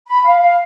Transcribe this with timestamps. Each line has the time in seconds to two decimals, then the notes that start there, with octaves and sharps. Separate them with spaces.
0.08 B5
0.24 F5
0.41 F5